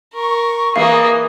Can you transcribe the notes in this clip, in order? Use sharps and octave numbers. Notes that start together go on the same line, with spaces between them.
A#4 C#6
E3 A#3 G#4 D#5 F5